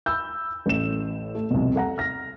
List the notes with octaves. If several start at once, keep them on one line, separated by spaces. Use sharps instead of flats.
B5 E6 G6
A1 A2 E7
A3
C2 F2 B2
A4 F#5 A#5
F6 A#6